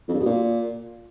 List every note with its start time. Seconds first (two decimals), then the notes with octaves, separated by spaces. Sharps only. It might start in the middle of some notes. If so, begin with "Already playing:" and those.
0.08 F2
0.14 G2
0.20 B2
0.25 A#2